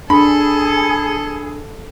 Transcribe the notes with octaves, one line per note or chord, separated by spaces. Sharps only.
D4 G#4 A4 B5